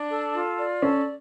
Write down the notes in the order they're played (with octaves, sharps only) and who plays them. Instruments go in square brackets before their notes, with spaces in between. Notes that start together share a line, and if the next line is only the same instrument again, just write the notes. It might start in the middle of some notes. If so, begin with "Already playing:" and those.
Already playing: [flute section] D4
A4
F4
D5
[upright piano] C#4 [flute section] A4